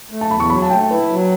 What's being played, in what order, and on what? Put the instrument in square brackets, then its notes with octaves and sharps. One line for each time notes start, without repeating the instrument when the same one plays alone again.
[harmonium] A3
[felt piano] A5
[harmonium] E2 [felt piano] B5
[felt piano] C#6
[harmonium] F#3 [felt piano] B5
[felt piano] A5
[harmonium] A3 [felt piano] G5
[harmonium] E4 [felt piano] B4
[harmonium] F#3